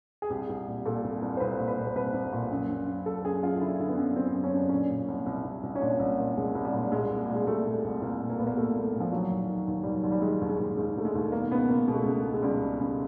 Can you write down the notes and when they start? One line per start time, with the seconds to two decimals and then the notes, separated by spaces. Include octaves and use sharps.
0.22 G#4
0.30 C2 G4
0.49 C2
0.67 A#2
0.85 A#2 A4
1.04 C2
1.22 C2
1.37 C5
1.40 C2 B4
1.59 A#2
1.68 B4
1.78 A#2
1.87 C5
1.95 C2 B4
2.14 C2
2.33 A#2
2.51 F#2
2.70 F#2
2.87 F#2
3.06 F#2 A4
3.25 F#2 G#4
3.43 F#2 F4
3.61 D3 E4
3.80 D3
3.88 B3
3.98 F#2
4.16 D3 C4
4.34 F#2
4.44 C#4
4.53 F#2 D4
4.69 A#2 C#4
4.90 A#2
5.08 C2
5.26 C2
5.44 C2
5.63 C2
5.76 C#4
5.82 A#2 D4
5.99 C2
6.19 A#2
6.37 C2 G#3
6.55 C2
6.65 G3
6.73 A#2
6.92 A#2 G#3
7.11 C2
7.25 A#2 G3
7.36 G#3
7.46 C2 A3
7.66 A#2
7.84 C2
8.01 C2 A#3
8.21 A#2
8.30 A#3
8.38 A#2 B3
8.47 A#3
8.57 A#2 A3
8.75 C2
8.94 A#2
9.00 F3
9.12 D#3 F#3
9.31 D#2
9.49 D#3
9.67 D#2
9.83 D#2 G3
9.94 F#3
10.04 D#2
10.12 G3
10.22 D#3 G#3
10.41 D#2
10.49 G#3
10.60 D#2
10.77 D#2 G#3
10.96 D#2 A3
11.05 G#3
11.15 D#2
11.32 B2 A#3
11.51 C#2 B3
11.69 C#2 A#3
11.88 B2 G#3
11.95 A3
12.03 C#2 G#3
12.24 B2
12.34 G#3
12.42 C#2 G3
12.61 B2
12.79 C#2